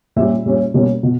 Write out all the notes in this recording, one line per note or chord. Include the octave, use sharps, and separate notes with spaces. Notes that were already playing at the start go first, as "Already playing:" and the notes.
A#2 G3 C#4 E5
A#2 G3 C#4
B2 G3 A#3 C#4
B2